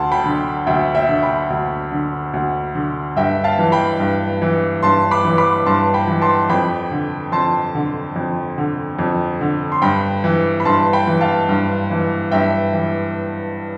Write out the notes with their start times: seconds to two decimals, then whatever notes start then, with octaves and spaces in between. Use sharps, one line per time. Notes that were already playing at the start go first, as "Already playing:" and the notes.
Already playing: D2 A5 C6
0.12 G5 B5
0.26 D3
0.67 D2 E5 G5
0.95 E5 G5
1.09 D3
1.22 G5 B5
1.50 D2
1.92 D3
2.33 D2
2.75 D3
3.16 G2 E5 G5
3.44 F5 A5
3.59 E3
3.72 G5 B5
4.00 G2
4.42 E3
4.83 G2 A5 C6
5.11 B5 D6
5.25 E3
5.38 B5 D6
5.66 G2 A5 C6
5.94 G5 B5
6.08 E3
6.21 A5 C6
6.50 F2 G5 B5
6.91 D3
7.32 F2 A5 C6
7.75 D3
8.16 F2
8.58 D3
8.99 F2
9.41 D3
9.72 C6
9.82 G2 G5 B5
10.24 E3
10.60 B5
10.65 G2 A5 C6
10.93 G5 B5
11.07 E3
11.21 F5 A5
11.49 G2
11.91 E3
12.31 G2 E5 G5
12.73 E3